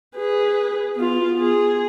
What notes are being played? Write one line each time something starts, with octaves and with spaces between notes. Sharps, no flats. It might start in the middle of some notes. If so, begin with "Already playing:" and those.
G#4 B4
B3 F4
G#4